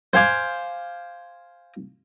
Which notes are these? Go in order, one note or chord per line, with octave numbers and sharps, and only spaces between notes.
C5 F5 G#5 D6